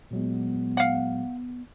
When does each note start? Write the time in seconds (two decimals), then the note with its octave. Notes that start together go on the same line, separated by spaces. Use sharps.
0.11 A#2 F#3 G#3 B3
0.77 F5 F#5